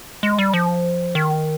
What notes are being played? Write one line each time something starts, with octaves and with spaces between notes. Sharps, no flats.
G#3
G3
F3
D#3